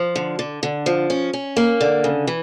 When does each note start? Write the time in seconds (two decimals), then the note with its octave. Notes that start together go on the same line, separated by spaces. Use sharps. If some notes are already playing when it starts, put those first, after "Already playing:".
Already playing: F3
0.16 D3
0.39 D3
0.63 D3
0.86 F3
1.10 C#4
1.33 C#4
1.57 A#3
1.81 D3
2.04 C#3
2.27 E3